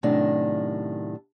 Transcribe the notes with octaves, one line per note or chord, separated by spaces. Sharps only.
F#2 A2 C3 D#3 D4